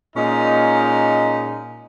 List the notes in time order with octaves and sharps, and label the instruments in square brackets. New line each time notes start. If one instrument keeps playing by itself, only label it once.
[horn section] A#2 G#3 C#4 D#4